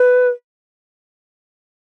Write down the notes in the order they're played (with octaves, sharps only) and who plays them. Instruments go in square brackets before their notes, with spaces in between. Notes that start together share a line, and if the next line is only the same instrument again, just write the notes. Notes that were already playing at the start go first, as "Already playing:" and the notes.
Already playing: [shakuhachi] B4